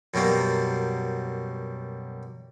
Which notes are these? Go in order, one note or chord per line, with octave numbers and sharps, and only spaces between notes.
F#2 B2 G3 A#3